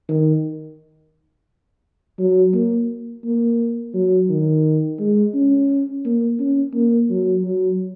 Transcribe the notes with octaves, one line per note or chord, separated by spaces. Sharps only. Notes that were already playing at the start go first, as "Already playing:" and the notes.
D#3
F#3
A#3
A#3
F#3
D#3
G#3
C#4
A#3
C#4
A#3
F#3
F#3